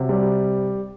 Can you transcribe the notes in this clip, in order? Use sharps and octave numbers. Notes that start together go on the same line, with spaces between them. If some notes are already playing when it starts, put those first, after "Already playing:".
Already playing: C3 F#3
G3